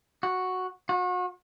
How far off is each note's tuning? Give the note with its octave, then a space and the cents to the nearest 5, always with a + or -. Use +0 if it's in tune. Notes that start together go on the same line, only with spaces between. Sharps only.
F#4 -5
F#4 -35